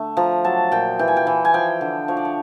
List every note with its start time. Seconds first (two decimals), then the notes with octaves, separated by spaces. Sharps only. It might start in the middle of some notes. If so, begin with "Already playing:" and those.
Already playing: D3 A3
0.17 F3 A#5
0.45 F#3 A5
0.72 A#2 G5
0.99 E3 G5
1.08 G#5
1.17 G5
1.27 E3
1.45 G#5
1.54 F3 G5
1.81 D3
2.08 F3 C#5
2.17 D5
2.25 C#5